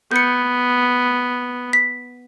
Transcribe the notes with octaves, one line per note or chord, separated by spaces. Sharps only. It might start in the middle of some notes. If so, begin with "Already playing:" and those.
B3 G6 C#7
B6